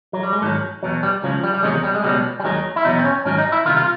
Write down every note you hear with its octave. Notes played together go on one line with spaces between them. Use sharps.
F#3
G3
G#3
G#2 D#3 F#3 A3
E2 B2 F#3
G3
C#2 C#3 F3 F#3
G3
G3
E2 C3 D#3 F#3 G#3
G3
G#3
C#2 B2 F#3 G3
G3
D#2 D#3 F#3 G#3
E4
E2 B2 F#3 D#4
C4
C#4
G#2 D#3 F#3 C#4
D#4
E4
C2 C3 D#3 F4
F4